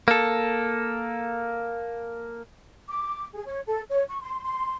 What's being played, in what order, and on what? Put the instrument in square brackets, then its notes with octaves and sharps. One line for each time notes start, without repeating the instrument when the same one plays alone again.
[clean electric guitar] A#3 A4
[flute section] D6
G#4
C#5
A4
C#5
C#6
C6
C6